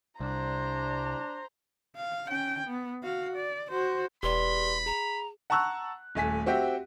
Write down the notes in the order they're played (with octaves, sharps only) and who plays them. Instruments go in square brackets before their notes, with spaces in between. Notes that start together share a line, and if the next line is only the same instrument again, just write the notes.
[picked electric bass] C2 [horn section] D4 [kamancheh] C5 A#5
[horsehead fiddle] F5
C#4 G5
B3
F#4 F5
D5
F#4 C5
[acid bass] E1 [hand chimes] G4 B4 D5 [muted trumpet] B5 [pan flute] C6
[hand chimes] G#4 [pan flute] A#5
[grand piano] F#5 A5 A#5 C#6 E6 F#6
D#1 A3 G#5 B6
C4 F#4 G4 E5 G5